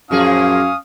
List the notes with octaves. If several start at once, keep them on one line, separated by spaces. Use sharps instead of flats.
F#2 A#2 F3 C#4 G#4 F5 D#6